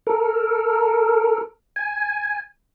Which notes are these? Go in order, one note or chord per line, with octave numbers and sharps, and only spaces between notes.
A4 A#4
G#5